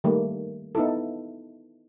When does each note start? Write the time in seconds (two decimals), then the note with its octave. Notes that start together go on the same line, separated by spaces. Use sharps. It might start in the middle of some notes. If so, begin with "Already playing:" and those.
0.04 D#3 G3 A3 A#3
0.75 B3 D#4 E4 A4